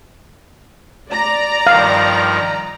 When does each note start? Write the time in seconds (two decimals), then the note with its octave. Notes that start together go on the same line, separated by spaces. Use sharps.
1.10 D5 A#5
1.67 G2 D#3 F3 F5